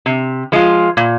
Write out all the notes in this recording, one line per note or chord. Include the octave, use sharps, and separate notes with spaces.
C3
F3 G#3 F4
A#2